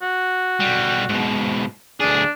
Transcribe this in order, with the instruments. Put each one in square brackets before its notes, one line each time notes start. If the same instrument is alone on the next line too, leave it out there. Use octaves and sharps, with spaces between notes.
[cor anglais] F#4
[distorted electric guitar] B1 G3
G#2 B2
[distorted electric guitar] D2 G#4 [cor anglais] D4